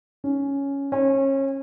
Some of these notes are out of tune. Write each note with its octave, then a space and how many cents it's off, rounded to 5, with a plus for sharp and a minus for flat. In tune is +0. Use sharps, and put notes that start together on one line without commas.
C#4 +5
C#4 -30